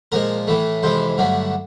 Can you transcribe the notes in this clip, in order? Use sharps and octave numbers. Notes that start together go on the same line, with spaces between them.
A#2 F3 G#3 A#4
A2 E3 A3
F2 C3 E3 G#3 C5
G2 D3 F#3 A3